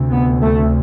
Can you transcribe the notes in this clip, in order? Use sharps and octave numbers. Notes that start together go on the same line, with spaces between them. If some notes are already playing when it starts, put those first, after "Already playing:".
Already playing: D2 C3
B3
A3